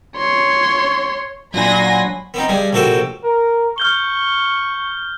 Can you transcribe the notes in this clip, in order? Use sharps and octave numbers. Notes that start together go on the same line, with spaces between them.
C#5 C6
A#2 F#3 D4 G#5 B5 C6 A#6
B3 C4 D#4
G2 G3 G#4
A#1 C3 F#4 A4 G5 C6
A#4
C#6 F6 G6 G7